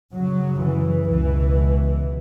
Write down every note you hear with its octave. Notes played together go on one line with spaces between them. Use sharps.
F#2 C#3 F#3
E3
C#2 B2 E3